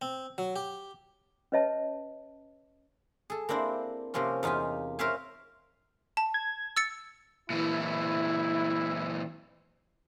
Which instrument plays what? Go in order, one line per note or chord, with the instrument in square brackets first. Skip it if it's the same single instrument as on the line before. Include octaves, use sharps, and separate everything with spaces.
[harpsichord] C4
F#3
G4
[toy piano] C#4 B4 C#5 D#5 E5 A5
[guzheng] G#4 A4
A#3 C4 D4 E4 C5
C3 F3 A#3 C4 C#4
E2 D#4 F4 G4 G#5
A#4 C5 C#5 E5 F5 G#5
[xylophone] A5
[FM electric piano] G#6
[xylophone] E6 A6 C#7
[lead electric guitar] A#2 E3 [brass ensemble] E4